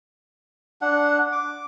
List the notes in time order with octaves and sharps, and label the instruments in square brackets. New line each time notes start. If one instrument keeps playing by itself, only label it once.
[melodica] D4 F#5
D6